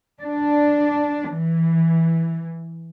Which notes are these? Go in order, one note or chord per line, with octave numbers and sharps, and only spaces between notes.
D4
E3